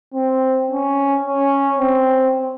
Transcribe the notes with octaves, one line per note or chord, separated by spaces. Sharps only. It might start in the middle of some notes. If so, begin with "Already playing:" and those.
C4
C#4
C#4
C4